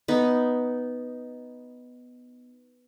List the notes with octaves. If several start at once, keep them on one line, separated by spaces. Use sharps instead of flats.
B3 D#4